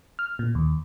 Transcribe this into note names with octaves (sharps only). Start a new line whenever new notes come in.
F6
A#2
D#2